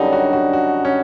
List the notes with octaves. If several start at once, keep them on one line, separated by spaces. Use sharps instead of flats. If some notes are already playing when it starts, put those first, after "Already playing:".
Already playing: F#2 D3 G3 D#4
F#4
F#4
F#4
C#4